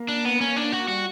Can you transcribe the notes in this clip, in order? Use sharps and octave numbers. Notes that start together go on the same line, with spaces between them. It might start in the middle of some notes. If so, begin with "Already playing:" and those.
Already playing: A#3
D4
B3
C#4
D4
A#3 F#4
G3 F#4